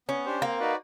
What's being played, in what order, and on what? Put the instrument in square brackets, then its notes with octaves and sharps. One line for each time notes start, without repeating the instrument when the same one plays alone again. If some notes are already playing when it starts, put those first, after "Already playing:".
[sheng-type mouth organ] B3 [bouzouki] C#4
[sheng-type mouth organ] D4 G4 C5
[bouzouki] A#3 [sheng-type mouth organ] C4
[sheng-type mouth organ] D#4 F#4 B4 D5